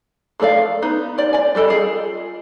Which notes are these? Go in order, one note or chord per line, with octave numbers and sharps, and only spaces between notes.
F3 A3 A4 D5 F5
B3 D#4
G4 D5
D5 G#5
G3 G4 A4 D#5
F4 G#4